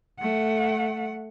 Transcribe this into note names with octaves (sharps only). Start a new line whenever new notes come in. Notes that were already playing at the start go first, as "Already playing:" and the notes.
A3 F#5